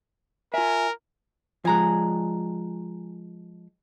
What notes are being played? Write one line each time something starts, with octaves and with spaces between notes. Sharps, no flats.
F4 A#4 E5 G#5
F3 G#3 G#5 A#5 F#6